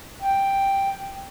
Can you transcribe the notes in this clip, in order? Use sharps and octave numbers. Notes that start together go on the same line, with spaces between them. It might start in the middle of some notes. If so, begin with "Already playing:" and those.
G5